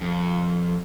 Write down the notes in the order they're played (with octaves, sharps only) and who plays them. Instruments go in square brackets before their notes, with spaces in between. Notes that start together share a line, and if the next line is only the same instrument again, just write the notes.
[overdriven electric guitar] F2